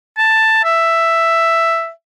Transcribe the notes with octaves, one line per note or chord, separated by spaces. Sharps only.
A5
E5